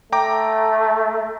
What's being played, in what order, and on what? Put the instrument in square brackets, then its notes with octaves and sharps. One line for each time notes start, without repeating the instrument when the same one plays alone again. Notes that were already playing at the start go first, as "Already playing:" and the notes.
[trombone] A3 [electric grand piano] G5 A#5 D6